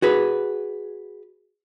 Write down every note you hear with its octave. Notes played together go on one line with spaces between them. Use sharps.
F#4 G#4 B4